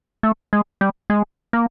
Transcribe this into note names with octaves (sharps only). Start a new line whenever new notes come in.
A3
G#3
G3
G#3
A#3